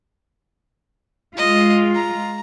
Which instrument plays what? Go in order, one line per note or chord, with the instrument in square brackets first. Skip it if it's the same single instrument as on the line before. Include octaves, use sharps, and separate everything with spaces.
[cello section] G#3 F4 [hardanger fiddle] D#5
[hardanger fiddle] A#5